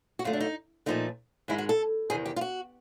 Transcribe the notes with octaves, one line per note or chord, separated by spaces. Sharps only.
F#4
F2 D3 F#3 A3 F4
D4
D#4
A#2 F3 A3 D#4
G#2 D#3 G#3 E4
F#4
A4
E2 C3 D#3 G#4
G4
F4
F#4